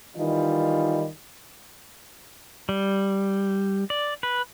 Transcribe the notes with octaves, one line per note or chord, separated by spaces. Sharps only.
D#3 E3 G3 D#4 F4
G3
D5
B4